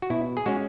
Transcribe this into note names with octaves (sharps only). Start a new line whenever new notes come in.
F#4
B2 E4
G#4
G#3 C#4 F#4